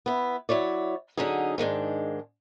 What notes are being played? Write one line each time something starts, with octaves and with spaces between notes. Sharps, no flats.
B3 E4
F#3 E4 C#5 D5
D3 F#3 C#4 D#4 G#4
G#2 D#3 G#3 D4